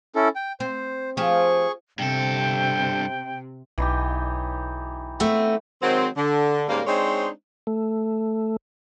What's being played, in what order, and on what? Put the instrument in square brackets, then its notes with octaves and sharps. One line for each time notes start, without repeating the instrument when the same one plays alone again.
[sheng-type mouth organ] C#4 E4 A4
G5
[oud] C4 [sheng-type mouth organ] C5
[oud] F3 G4 [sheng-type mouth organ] G#4 C#6
[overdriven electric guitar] G2 A4 [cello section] C3 [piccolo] G5
[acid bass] B1 [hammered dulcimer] E3 D#4 G4
[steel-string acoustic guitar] A3 B3 C4
[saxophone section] D#3 F#3 G#3 C4
D3
G#2 C#3 G3 A#3
G#3 C4 D4 D#4 C5 C#5
[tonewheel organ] A3